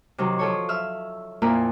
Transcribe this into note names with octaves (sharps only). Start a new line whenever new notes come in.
C3 D#3 F#3
F3 A4 C#5
E5 E6 F6
F2 A#2 A#3 E4 F4 A#4